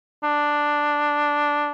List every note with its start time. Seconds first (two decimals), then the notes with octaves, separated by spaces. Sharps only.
0.23 D4